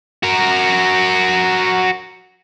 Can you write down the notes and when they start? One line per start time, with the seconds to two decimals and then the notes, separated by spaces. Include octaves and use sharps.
0.23 F#4 A#4